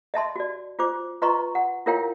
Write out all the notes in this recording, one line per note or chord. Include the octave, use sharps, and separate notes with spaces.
D#5 E5 A5 C6
F#4 D5
F4 C5 D6
F4 B4 D#5 A#5 C6 C#6
F#5
E4 F4 A#4 C#5 F5 G5